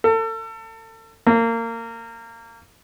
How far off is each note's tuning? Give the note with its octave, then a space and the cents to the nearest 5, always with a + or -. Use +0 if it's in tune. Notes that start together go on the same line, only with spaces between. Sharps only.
A4 +35
A#3 -25